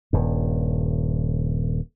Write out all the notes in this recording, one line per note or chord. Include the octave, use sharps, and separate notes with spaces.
D#1 G2